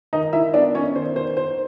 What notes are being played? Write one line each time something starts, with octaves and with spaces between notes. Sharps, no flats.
D#3 D#4 D#5
E4 E5
B3 D4 D5
C#4 C#5
D#3 C5
C5
D#3 C5